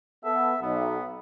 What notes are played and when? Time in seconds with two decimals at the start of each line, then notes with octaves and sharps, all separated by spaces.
0.25 B3 A4 E5
0.62 B1 B3